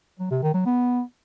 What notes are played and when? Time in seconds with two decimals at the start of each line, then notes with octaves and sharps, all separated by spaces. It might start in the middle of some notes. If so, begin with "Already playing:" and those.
0.19 F#3
0.31 C3
0.42 D#3
0.54 F#3
0.66 B3